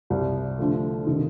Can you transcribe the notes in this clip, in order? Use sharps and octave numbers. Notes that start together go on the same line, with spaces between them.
C2 C3 G3
D3 F3 A3
C3 D#3